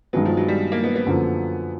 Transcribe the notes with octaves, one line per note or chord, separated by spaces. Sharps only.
G2 D#3 F#3 G#3 B3
F3
F#3
G3
A#3
B3
B3
F#2 D3 F3 A#3